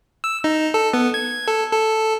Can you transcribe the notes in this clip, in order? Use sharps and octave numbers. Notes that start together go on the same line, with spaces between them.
E6
D#4
A4
B3
G#6
A4
A4